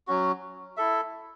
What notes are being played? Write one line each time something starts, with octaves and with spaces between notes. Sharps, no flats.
F#3 C#4 F#4
E4 A4 E5